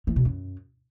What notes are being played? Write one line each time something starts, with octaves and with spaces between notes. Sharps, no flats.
E3
B2
F#2